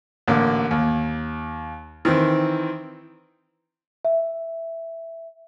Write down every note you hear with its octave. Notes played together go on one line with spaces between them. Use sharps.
A1 D3 A#3
D#2
D#3 E3 C4
E5